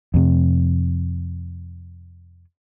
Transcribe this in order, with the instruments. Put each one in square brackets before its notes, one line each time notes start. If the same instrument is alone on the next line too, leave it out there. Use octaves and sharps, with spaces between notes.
[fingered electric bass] F2 C3